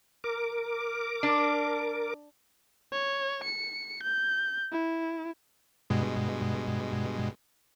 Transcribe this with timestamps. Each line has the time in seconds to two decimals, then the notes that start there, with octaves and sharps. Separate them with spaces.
0.24 A#4 D6
1.23 D4
2.92 C#5
3.44 C#7
4.03 G6
4.72 E4
5.90 G2 B2 G#3